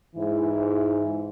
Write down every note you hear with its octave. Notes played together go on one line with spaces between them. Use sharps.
G#2 E3 E4